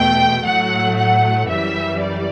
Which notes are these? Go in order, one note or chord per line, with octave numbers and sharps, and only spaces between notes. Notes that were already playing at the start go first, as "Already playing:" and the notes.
Already playing: E2 B2 A3 G5
A2 F#3 A3 F#5
F#5
F#2 E3 G3 E5
D5